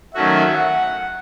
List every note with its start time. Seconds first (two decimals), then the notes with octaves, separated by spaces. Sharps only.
0.15 D#3 F#3 A3 C#4 F#4 E5
0.55 F#5